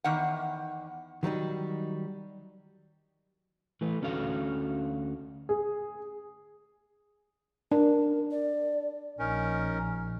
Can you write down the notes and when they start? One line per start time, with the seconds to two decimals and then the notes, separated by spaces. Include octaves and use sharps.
0.04 E2 D#3 F#5
1.23 D#3 F#3 G3 D#4
3.81 E3 A3 B4
4.02 D2 C#4 F#4 A4 F5
5.49 G#4
7.72 D4 A#4
8.31 D5
9.19 A#1 C#4 D#4 A#4